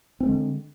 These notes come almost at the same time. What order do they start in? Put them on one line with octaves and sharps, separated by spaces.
C4 A#3 G#3 D3